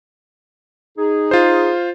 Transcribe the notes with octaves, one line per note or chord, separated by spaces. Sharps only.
D#4 G#4
F4 C5